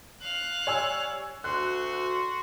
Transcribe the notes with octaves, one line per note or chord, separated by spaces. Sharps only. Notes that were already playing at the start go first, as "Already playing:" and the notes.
F5 F#6
G3 C#5 G#5 E6
D2 F#4 C6 F#6